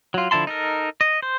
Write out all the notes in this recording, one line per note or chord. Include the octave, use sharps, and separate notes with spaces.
F#3 F4
D3 F3 E4 A5 C6
D#4 A4 A#4
D#5
C5